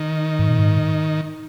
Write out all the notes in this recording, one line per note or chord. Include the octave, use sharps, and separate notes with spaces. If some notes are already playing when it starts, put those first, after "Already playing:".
Already playing: D#3
G#2
A#2
G#2